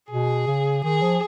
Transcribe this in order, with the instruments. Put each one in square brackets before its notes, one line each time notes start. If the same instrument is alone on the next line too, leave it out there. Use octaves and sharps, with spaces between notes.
[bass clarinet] B2 [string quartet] G#4
[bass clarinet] C#3
[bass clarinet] D#3 [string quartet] G#4
[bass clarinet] F3